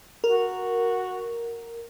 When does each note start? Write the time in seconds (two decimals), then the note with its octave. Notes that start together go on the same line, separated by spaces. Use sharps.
0.24 F#4 A#4